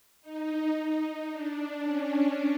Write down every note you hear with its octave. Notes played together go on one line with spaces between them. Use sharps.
D#4
D#4
D4
C#4